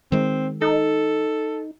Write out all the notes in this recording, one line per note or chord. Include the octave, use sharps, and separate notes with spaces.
D#3 G#3 C4
D#4 A4